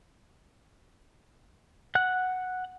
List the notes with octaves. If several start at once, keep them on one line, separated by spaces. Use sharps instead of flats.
F#5 F#6